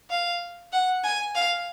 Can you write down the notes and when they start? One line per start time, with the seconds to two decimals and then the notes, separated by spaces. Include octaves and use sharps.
0.10 F5
0.73 F#5
1.04 G#5
1.35 F5